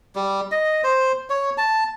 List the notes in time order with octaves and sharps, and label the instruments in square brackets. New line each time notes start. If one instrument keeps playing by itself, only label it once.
[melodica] G3
D#5
C5
C#5
A5